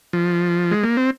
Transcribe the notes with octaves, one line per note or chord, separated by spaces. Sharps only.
F3
G#3
A#3
C4